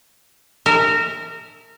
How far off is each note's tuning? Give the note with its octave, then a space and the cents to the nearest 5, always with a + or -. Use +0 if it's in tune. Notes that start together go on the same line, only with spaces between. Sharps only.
A#4 -25 E5 -15